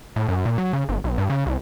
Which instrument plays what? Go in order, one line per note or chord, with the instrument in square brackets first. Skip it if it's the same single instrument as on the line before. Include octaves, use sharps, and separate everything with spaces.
[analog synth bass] A2
F#2
A#2
F#3
C#3
G1
B1
G2
C#3
C2